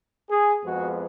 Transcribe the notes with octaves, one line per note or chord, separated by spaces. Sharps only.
G#4
F2 F3 G#3 B3 F#4